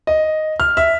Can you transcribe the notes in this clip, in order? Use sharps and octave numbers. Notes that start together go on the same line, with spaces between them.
D#5
F6
E5